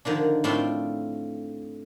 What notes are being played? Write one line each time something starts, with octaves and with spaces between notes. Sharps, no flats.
D3 D#3 F3 D4
A2 C4 D4 F4 C6